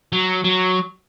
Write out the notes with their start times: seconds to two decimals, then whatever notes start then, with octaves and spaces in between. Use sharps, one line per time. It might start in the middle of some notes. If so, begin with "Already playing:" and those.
0.12 F#3
0.44 F#3